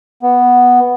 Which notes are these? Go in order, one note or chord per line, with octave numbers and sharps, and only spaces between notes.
B3